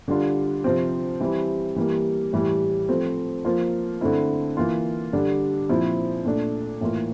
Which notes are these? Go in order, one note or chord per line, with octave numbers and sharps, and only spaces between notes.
D3 G3 D4 F4
C3 F3 C4
E3 G3 C4 E4
E3 G3 A#3
A2 E3 G3
F3 A3 C4
F3 A#3 F4
D3 A3 C4 E4
E3 A#3 F4
D3 G3 D4
A#2 F3 C4 E4
A#2 A3 D4
A2 E3 A#3 F4